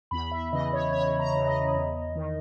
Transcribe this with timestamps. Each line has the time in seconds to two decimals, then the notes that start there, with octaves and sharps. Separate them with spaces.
0.11 E2 B5
0.32 E5
0.52 C#3 E3 D#5
0.73 C#5
0.92 E2 C#5
1.20 A#5
1.34 C#3 E3
1.47 D#5
1.75 E2
2.16 D#3